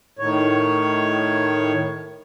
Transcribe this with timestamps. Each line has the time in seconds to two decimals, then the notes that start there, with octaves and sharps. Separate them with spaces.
0.19 A2 D#3 C#5